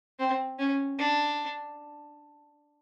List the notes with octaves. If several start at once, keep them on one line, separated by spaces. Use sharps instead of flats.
C4
C#4
D4